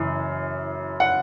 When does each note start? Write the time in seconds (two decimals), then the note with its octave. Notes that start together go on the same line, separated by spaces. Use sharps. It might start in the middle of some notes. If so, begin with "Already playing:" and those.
Already playing: F#1 F#2 E3
1.00 F#5